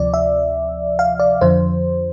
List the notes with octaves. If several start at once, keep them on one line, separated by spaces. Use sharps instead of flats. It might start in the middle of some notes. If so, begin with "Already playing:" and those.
Already playing: D2 C3 F3 D5
E5
F5
D5
F2 D3 F3 C5